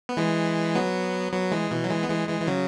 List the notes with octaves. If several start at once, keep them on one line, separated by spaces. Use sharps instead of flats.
B3
E3 G#3
F#3 B3
F#3 B3
E3 G#3
B2 E3
F#3
E3 G#3
B3
E3 G#3
E3 G#3
E3
C#3 F#3